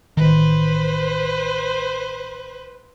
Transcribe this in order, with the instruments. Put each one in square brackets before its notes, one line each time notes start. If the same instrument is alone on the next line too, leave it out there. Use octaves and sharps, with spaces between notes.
[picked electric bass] A1 D#3 [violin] B4 C5